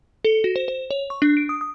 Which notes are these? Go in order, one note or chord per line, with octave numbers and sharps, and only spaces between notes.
A4
F#4
C5
C5
C#5
C#6
D4
D7
D#6
D#6